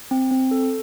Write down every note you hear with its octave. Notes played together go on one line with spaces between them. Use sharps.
C4
C4
A4